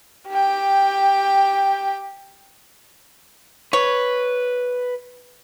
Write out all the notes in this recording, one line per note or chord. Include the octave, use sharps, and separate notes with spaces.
G4 G5
B4 C#5